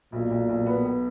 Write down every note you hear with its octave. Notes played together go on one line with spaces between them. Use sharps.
B1 A#2
B1
B1
B3
B3